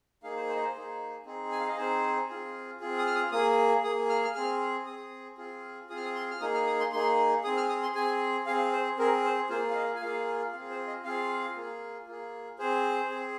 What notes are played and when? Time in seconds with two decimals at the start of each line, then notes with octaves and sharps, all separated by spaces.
0.23 A#3 D#4 G#4 F5
0.36 C5
0.49 C5
0.56 D#5
0.62 C5
0.75 A#3 D#4 G#4
1.26 C4 D#4 G#4
1.52 G#5
1.60 F5
1.68 D#5
1.77 C4 D#4 G#4 C5
2.29 C4 F4 G#4
2.80 C4 F4 G#4
2.98 D#6
3.07 F6
3.15 D#6
3.32 A#3 G#4 D#6
3.83 A#3 G#4 D#6
4.10 F6
4.24 F6
4.35 C4 G#4 F6
4.86 C4 G#4 D#6
5.38 C4 F4 G#4
5.90 C4 F4 G#4 D#6
5.97 F6
6.04 D#6
6.15 C6
6.30 F6
6.40 A#3 D#4 G#4 D#6
6.54 F6
6.67 D#6
6.80 C6
6.92 A#3 D#4 G#4 C6
7.44 C4 G#4 D#6
7.57 F6
7.69 D#6
7.83 C6
7.95 C4 G#4 G#5
8.46 C4 G#4 F5
8.73 C5
8.98 C4 G#4 A#4
9.24 C5
9.49 A#3 F4 G#4 C5
9.71 F5
9.75 D#5
9.96 G#5
10.01 A#3 F4 G#4 F5
10.52 C4 F4 G#4 F5
10.71 C5
10.87 D#5
11.04 C4 F4 G#4 F5
11.56 A#3 F4 G#4
12.07 A#3 F4 G#4
12.59 C4 G#4 C5
13.10 C4 G#4